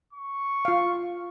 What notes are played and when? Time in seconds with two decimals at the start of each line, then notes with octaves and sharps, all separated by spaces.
0.13 C#6
0.65 F4 F5